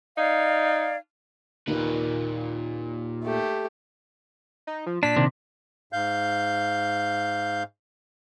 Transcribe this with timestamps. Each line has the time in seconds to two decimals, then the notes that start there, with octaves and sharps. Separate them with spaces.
0.17 D#4 D5 F5 G#6
1.67 D#2 A#2 A#3 D#4 B4
3.24 A3 G4
4.67 D#4
4.86 F3
5.03 A#2 D4 B6
5.17 C3 D#3
5.93 G#2 F5 G6